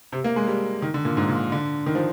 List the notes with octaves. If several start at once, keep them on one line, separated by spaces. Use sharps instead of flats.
C3
A#3
G#3
G3
D#3
D3
A#2
G#2
A#2
D3
D#3
F3